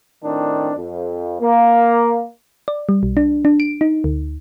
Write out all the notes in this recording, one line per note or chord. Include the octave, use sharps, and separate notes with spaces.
A2 D#3 C4 D4
F2
A#3
D5
G3
B1
D4
D4
D7
D#4
D2